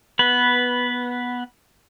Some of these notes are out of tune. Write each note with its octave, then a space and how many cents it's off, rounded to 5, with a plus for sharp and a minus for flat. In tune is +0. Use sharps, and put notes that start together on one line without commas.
B3 -10 B4 +0